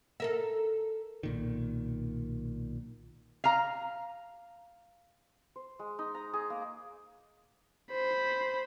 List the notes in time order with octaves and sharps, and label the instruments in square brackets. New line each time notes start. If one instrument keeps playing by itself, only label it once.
[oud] A4 A#4 E5
[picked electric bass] B1 A#2 D#3
[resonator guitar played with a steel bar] F5 A#5
[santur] C5
G#3
D#4
A#5
G#4
A#3
[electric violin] C5 B5